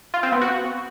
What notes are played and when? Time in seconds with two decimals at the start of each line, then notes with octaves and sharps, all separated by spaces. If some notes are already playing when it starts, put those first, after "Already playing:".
0.14 F4
0.23 C4
0.32 B3
0.41 F#4